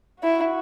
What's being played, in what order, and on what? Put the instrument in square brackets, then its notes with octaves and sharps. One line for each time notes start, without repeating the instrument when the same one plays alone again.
[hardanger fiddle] E4 [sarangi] F#4